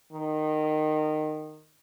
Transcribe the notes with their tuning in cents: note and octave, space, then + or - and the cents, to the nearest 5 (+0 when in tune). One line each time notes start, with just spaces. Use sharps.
D#3 -20